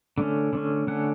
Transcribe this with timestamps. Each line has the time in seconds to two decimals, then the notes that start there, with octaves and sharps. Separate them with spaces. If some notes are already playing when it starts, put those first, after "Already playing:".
0.18 D3 A3 C#4
0.53 D3 A3 C#4
0.87 D3 A3 C#4 F#5